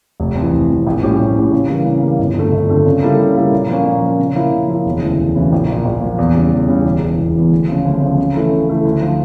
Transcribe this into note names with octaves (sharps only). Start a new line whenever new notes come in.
F1
F2 E3
F1
F2 E3
A#1
A2 G3 C#4 G4
A#1
A2 G3 C#4 G4
C#3
E3 G3 A#3
C#3
E3 G3 A#3
G1
F2 D3 A3
G1
F2 D3 A3
C#3
G3 A#3 E4 A4
C#3
G3 A#3 E4 A4
A#2
F3 A#3 C#4
A#2
F3 A#3 C#4
C#3
F3 A#3 E4
C#3
F3 A#3 E4
E1
D2 C#3 E3
E1
D2 C#3 E3
A#1
A#2 F3
A#1
A#2 F3
E2
C#3 G3
E2
C#3 G3
E1
E2 E3
E1
E2 E3
D2
C#3 F3
D2
C#3 F3
C#3
E3 A3 E4
C#3
E3 A3 E4
D2
D3 F3